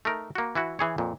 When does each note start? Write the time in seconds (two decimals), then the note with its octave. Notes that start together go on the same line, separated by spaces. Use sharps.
0.05 A3 D#4 A#4
0.35 A#3 F#4
0.55 E3 E4 F#4
0.79 E3 G#4 C#5
0.98 F2 A#2